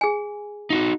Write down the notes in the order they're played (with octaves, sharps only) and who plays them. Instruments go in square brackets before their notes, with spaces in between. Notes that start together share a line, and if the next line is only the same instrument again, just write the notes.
[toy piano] G#4 G#5
[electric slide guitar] D#4 F4 F#4